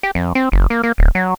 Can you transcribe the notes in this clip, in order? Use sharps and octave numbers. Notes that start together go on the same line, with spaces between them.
G4
F2
C4
F#1
A#3
A#3
D1
F#3